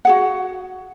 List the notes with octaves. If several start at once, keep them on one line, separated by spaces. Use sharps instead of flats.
F#4 G#4 F#5